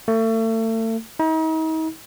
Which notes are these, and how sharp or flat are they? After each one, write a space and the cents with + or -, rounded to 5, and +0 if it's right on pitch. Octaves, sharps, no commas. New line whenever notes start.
A3 +35
D#4 +40